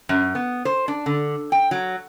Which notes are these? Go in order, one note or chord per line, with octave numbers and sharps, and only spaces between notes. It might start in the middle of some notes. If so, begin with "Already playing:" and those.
F#2
B3
C5
D4
D3
G5
F#3